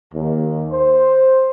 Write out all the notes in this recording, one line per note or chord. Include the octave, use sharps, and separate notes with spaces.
D#2
C5